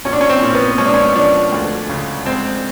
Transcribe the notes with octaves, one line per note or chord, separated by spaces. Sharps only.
A#1 C#4
D4
C#4
C4
A#2
B3
G#3 C#4
D4
C#4
F3 D4
D2
C#3
G#3 C4